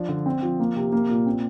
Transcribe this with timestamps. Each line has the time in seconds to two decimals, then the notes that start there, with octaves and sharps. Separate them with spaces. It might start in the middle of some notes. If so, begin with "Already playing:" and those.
Already playing: F3 D4
0.09 D3
0.26 C4
0.43 F3
0.60 A#3
0.76 C3
0.92 A#3
1.09 A#2
1.26 C4